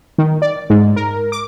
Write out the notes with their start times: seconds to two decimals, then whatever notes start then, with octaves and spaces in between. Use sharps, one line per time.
0.18 D#3
0.42 D5
0.70 G#2
0.96 A#4
1.32 D6